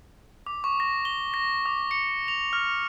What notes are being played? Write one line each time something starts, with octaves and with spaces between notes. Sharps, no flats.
D6
C#6
A#6
G7
A#6
D6
C#7
F7
F6